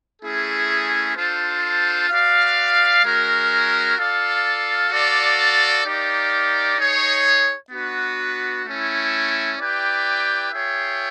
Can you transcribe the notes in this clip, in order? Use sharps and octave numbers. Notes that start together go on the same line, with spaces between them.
A3 C#4 E4 G#4
D4 F4 A4 C5
F#4 B4 D5 F5
G#3 C#4 F#4 A#4
F4 A4 D5 F5
F#4 A4 D5 F5
D#4 G4 A#4 D5 F5
D#4 G#4 C#5
B3 D4 F#4 B4
A3 C#4 E4
E4 G4 B4 D5 G5
F4 G#4 C#5 E5 G5